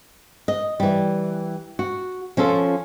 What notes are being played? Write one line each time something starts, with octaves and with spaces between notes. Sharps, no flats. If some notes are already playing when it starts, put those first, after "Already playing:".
D#5
E3 G3
F#4
F3 C#4 F4 A4